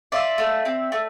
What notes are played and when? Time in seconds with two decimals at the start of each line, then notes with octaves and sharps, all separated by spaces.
0.12 F4 D5 E5
0.38 A3
0.65 C4
0.92 A3